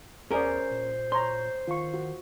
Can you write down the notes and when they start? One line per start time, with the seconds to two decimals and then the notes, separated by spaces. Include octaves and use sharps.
0.31 E2 C#4 G#4 A#4 C5 D5
0.71 A#2
1.12 C#5 A#5 C6
1.67 D#3 F4 C#6
1.94 F#4